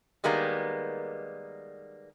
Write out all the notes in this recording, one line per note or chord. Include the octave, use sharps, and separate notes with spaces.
D#3 G3 G#3 A#3 B3